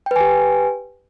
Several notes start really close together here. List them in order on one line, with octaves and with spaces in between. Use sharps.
G5 B4 G#5 G4